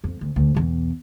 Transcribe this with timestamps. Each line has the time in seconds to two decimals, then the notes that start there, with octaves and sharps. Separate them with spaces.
0.04 F2
0.21 D2
0.36 D2
0.54 B1 E2